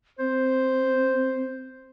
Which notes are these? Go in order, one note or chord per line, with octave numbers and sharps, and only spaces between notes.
C4 C5